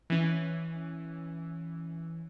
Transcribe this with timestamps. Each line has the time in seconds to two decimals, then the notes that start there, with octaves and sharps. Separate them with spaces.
0.10 E3 C#4